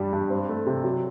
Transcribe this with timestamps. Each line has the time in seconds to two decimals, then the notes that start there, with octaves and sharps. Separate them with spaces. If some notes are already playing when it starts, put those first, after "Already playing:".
Already playing: G2 G3
0.13 G2
0.30 C4
0.49 A3
0.66 C3
0.84 F#3